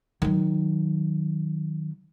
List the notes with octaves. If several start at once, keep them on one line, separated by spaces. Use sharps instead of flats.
D#3 F#3